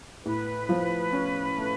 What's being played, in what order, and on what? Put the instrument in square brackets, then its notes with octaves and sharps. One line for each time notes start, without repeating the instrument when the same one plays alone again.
[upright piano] A2 [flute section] B4
[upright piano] F3
C#4
A3